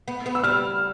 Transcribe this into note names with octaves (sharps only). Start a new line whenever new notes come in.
B3
B3
E6
G3 F6